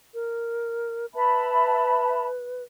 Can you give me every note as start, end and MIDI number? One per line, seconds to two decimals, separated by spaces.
0.14 1.06 70
1.15 2.63 71
1.15 2.26 76
1.15 2.26 81
1.15 2.26 83